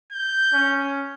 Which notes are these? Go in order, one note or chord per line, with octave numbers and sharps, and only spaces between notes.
G6
C#4